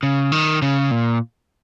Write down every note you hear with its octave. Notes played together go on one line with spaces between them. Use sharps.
C#3
D#3
C#3
A#2